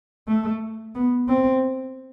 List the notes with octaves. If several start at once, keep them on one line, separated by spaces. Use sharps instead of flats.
A3
B3
C4